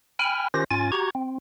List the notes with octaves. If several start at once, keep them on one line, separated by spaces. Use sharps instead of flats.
G5 G#5 B5 F6
D#3 C#4 F4 G4 C5 A#6
G#2 C#4 F4 G#5 A6
F#4 G4 A#5 C#6 G#6
C4